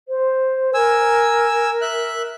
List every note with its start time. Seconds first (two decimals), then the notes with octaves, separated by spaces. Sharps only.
0.08 C5
0.74 A#4 G#5 E6
1.81 E5 F#6